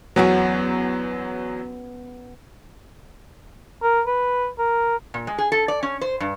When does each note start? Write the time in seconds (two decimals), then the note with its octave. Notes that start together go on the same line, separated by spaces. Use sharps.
0.16 E2 F#3 B3 C#4 F#4
3.83 A#4
4.07 B4
4.59 A#4
5.14 A#2
5.27 G#3
5.38 G#4
5.52 A4
5.68 D5
5.83 C#4
6.01 C5
6.20 G2